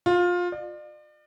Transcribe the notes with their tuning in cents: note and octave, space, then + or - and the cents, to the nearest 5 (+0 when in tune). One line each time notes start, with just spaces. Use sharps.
F4 +20
D5 +40